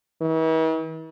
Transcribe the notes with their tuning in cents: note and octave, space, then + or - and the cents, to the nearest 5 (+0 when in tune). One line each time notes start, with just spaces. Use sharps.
E3 -45